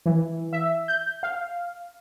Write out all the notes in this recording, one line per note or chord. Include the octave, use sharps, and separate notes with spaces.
E3
E5
G6
F5